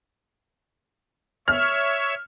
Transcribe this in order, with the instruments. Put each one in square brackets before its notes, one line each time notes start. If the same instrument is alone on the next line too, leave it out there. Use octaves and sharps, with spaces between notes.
[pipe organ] C#5 E5 [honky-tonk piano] F6